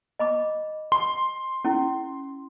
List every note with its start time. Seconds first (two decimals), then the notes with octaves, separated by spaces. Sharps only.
0.19 D#5 B5 D6
0.92 C6
1.65 C#4 E4